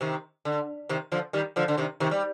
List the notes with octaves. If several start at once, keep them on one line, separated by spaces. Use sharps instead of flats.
C3 D#3
D3
C3 D#3
D3 F3
D#3 G3
D3 F3
D3
C3 D#3
C3 D#3
G3